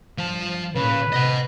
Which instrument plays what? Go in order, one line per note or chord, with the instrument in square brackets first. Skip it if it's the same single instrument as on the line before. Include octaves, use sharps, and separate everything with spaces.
[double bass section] G2 [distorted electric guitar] F3 A5
[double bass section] A1 A#2 [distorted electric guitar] C#3 [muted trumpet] B4
[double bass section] C3 [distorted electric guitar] D#5 F#5